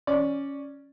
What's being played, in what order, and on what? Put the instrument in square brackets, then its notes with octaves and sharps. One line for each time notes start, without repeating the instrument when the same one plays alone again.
[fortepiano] C#4 D5